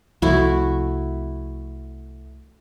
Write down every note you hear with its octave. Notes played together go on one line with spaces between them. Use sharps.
C2 F3 A3 E4 F#4